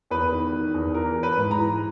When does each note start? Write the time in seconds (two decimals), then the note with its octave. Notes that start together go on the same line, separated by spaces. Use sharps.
0.10 E2 B4
0.32 D#3
0.52 D#3
0.74 E2
0.94 E3 A#4
1.16 E3
1.23 B4
1.37 G#2
1.51 A#5
1.58 E3